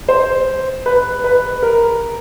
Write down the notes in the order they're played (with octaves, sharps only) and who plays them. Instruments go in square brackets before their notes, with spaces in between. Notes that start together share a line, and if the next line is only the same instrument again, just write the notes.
[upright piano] C5
B4
B4
A#4